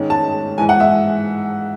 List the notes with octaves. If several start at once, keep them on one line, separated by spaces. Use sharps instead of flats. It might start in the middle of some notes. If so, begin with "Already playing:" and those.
Already playing: G#2 D#3 G#3 C#4
A5
G#2 E3 G#3 G#5
F#5
E5